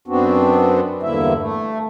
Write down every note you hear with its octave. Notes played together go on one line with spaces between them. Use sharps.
F#2 B3 C4 D4 F#4
E2 G2 D3 A#3 E4 E5
A3